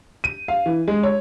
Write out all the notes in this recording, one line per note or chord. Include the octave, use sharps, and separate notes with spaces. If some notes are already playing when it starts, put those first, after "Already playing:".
D#7
F5
E3
G#3
C#5